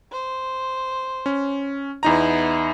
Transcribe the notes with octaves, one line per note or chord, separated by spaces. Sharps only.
C5
C#4
E2 B3 D#4 E4 A#5